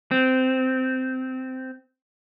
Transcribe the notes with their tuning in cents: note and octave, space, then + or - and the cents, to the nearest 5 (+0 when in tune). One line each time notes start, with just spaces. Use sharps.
C4 -15